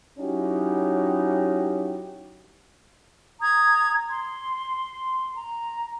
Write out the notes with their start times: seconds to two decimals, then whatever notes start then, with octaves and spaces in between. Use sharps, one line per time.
0.19 F#3 C#4 D#4 E4 F#4 G4
3.41 A#5 D#6 G#6
4.10 C6
5.36 A#5